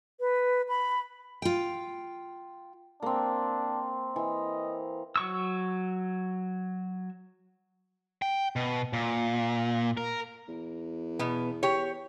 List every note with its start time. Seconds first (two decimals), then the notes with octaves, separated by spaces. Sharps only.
0.20 B4
0.69 B5
1.42 F4 G5
3.02 A#3 C4 D4
4.16 E3 D#5
5.16 F#3 C#6 E6
8.22 G5
8.56 B2
8.93 A#2
9.97 A#4
10.48 E2
11.19 B2 B3
11.63 G4 C#5